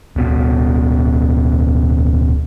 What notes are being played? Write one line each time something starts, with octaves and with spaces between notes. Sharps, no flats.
D1 B2